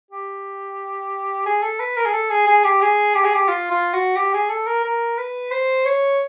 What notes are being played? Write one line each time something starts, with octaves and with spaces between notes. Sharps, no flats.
G4
G#4
A4
B4
A#4
G#4
A4
G#4
G#4
G4
G#4
G4
G#4
G4
F4
F4
F#4
G4
G#4
A4
A#4
A#4
B4
C5
C#5